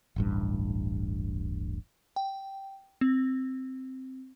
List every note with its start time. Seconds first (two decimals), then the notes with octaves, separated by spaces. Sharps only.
0.16 D1 A1 G2
2.16 G5
3.01 C4